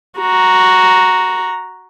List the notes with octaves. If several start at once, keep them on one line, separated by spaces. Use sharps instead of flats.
F#4 A#5